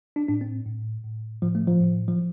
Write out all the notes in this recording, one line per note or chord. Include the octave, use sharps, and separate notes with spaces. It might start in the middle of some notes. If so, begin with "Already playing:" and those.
D4
A2 D4
C4
A2
A2
A2 F3
A3
F3
A2
F3